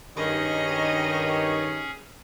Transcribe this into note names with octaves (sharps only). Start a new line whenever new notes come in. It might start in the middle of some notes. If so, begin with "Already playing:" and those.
G2 D#3 C#4 D#4 G4 G#4 C#5 D#5